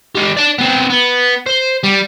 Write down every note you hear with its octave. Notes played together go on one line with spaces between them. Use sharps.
G#3 G4
D5 A5
B3 C4
B3
C5
G3